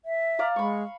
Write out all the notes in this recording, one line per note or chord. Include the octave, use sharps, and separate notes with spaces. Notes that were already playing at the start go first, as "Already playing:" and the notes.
E5
D5 F5 A#5
G#3 B5 C#6